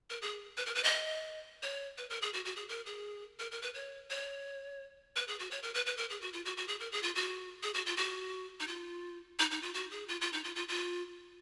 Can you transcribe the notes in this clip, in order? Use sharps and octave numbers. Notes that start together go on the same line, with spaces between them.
A#4
G#4
B4
A#4
B4
D#5
C#5
B4
A#4
G#4
F#4
F#4
G#4
A#4
G#4
A#4
A#4
B4
C#5
C#5
B4
G#4
F#4
C#5
A#4
B4
B4
A#4
G#4
F#4
F4
F#4
F#4
G#4
A#4
G#4
F4
F#4
G#4
F#4
F4
F#4
D#4
F4
D#4
D#4
F4
F#4
G#4
F4
F4
D#4
F4
F4
F4